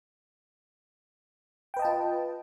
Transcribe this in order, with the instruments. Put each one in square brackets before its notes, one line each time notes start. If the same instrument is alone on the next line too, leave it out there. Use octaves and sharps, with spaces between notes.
[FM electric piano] G5
B4
D#5
A5
F4